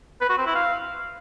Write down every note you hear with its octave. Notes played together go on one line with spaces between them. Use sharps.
B4
F#4
C4
E4
F5